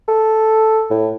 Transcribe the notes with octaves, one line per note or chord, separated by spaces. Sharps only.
A4
A2